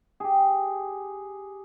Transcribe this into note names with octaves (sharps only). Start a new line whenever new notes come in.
G4 G#4